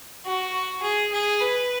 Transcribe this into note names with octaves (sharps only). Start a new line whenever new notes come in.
F#4
G#4
G#4
B4